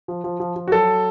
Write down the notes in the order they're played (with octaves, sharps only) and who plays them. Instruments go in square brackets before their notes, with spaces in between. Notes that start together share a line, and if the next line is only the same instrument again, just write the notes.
[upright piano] F3
F3
F3
F3
F#4
F#3 A4